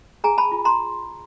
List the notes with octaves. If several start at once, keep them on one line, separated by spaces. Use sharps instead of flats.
G#4 G#5 A#5
A5 B5
F4
A#5 C6